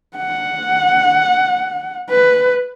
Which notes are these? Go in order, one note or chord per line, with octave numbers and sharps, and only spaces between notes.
F#5
B4